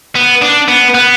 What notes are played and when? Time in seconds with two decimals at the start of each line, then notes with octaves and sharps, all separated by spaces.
0.15 B3
0.42 D4
0.68 B3
0.94 B3